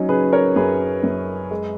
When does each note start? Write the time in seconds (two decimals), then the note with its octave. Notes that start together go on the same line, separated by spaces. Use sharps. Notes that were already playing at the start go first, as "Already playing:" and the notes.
Already playing: F#3 C#4 D#4
0.09 C#3 G#4 B4
0.33 A#4 C#5
0.56 F#2 G#4 B4
1.03 F#2
1.51 G#3